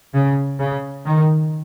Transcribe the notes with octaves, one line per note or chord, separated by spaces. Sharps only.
C#3
C#3
D#3